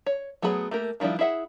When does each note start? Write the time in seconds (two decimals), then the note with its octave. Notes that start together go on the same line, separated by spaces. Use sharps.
0.06 C#5
0.42 F#3 A3 B3 G#4 B5
0.71 A3 A#3 G4 A#4
1.00 D#3 F3 G3 D4 E4
1.19 E4 G#4 E5 F#5